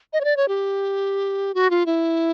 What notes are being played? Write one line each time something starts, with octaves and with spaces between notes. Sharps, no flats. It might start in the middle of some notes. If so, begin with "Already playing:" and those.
D#5
C#5
D5
C#5
G4
F#4
F4
E4